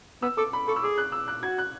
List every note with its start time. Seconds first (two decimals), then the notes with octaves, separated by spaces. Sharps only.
0.22 B3 E6
0.37 A4 D6
0.53 B5
0.68 A4 C#6
0.76 E6
0.83 G#4 D6
0.98 F#6
1.12 E6
1.28 F#6
1.43 F#4 G#6
1.58 F#6